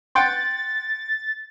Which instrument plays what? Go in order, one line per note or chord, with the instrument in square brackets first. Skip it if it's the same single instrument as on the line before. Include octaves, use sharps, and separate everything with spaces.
[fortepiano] F#5 G5 C6 [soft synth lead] A6